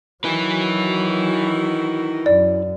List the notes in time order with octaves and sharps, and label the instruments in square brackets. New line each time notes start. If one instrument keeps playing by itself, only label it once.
[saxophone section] D#3 E3 F#4 [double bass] F#3 [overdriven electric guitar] E4 B4
[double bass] F#2 [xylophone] D5